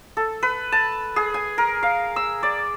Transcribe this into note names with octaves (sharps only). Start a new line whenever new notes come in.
A4
B4
A5
G#4
G#5
A#4
F5
E6
D5